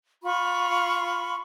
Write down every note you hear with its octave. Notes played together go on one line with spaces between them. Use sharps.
F4 B5 C#6